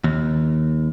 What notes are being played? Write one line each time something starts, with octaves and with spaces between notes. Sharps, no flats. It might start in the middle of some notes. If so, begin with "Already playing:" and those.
D#2